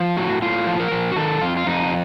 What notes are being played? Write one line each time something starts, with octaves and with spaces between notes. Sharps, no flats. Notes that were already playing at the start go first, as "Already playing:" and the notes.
Already playing: F3
A2 F#4
A2 F4
F3
A#4
F3
F#4
D#3 A4
F2 F4
F4
F2 D#4